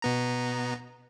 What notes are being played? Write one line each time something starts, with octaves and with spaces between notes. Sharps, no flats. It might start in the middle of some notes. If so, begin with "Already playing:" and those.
B2 B3 A#5